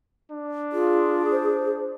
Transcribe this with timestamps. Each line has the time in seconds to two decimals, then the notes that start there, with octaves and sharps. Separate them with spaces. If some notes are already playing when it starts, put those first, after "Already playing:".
0.31 D4
0.72 F4 G#4
1.31 C5